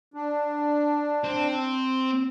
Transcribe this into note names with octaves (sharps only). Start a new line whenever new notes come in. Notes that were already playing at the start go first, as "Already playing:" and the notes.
D4
C4